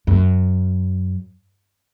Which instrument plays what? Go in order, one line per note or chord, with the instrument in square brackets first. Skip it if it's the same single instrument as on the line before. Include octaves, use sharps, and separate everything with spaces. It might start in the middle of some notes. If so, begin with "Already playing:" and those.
[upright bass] F#2